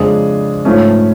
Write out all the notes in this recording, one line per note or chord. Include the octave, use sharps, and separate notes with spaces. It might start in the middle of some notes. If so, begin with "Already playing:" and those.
Already playing: F2 C#3 G#3 D4 G#4
G#2 F3 A3 C#4